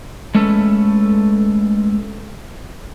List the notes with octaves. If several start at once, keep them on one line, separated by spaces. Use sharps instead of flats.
G#3 A3 C#4 A4 B4